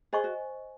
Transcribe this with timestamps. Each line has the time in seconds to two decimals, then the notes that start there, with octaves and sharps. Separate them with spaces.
0.13 G#4 C5 D#5 G#5 C#6
0.24 F#4